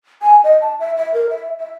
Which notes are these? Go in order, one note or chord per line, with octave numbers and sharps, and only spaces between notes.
G#5
D#5
A5
E5
E5
A#4
E5
E5